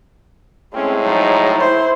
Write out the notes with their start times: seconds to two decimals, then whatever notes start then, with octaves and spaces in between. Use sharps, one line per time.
0.74 A2 G#3 C4 C#4
1.04 F3 F#3 D#4
1.56 E4 C5